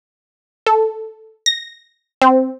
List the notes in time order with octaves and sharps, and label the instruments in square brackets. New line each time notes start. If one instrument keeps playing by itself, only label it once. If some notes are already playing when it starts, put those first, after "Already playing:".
[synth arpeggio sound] A4
A#6
C4